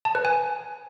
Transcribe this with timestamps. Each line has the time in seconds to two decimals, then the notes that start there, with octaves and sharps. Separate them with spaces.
0.05 A5
0.15 B4
0.25 G#5